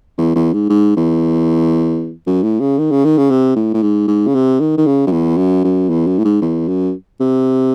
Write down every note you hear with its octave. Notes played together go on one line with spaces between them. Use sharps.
E2
E2
G#2
G#2
E2
F#2
A2
C#3
D#3
C#3
D#3
C#3
C3
A2
A2
G#2
G#2
C#3
C3
D#3
D#3
C#3
F#2
E2
F#2
F#2
E2
F#2
A2
G#2
E2
F#2
C3